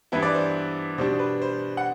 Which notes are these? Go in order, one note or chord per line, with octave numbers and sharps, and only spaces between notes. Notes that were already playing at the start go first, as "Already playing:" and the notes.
G2 E3 B3 E4 B4
D5
C5
B2 G3 D4 C5
B4
C5
F#5